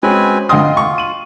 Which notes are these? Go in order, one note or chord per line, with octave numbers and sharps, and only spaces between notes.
G#3 C4 C#4 F#4 B4 G#5
D3 F4 D#5 G5 C6 D#6
C#6
D#7 F#7